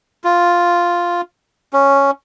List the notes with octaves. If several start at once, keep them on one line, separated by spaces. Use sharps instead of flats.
F4
C#4